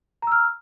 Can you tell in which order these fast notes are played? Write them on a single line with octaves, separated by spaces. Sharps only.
A#5 E6 F6